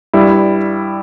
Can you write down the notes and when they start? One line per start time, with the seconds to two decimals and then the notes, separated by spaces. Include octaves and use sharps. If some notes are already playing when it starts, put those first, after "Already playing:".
0.13 G2 G3 E4